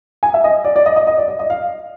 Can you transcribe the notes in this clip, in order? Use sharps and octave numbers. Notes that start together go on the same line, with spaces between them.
G#5
E5
D#5
D5
D5
D#5
D#5
D#5
D5
D5
D#5
F5